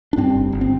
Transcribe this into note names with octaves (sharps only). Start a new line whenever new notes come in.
D4
G2 C4
G1
G1
C4